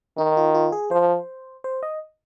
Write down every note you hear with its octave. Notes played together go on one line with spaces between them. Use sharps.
D#3 D#4
F4
F4
G#4
F3 C5
C5
D#5